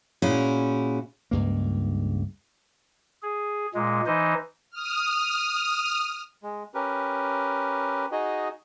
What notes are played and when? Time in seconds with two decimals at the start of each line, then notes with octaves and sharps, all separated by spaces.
0.22 A#2 C#4 E4 F#4 G#4
1.31 C#2 G2 A#3
3.23 G#4
3.74 A#2 G#3
4.06 E3 D#4 C5 D#5
4.71 D#6 F6
6.43 G#3
6.74 C#4 G4 A#4 B4
8.12 D#4 F#4 G#4 D#5